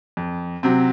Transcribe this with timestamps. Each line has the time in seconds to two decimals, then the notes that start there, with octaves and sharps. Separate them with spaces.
0.17 F2
0.63 C3 F#3 C4